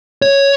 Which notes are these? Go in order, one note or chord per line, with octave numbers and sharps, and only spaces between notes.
C#5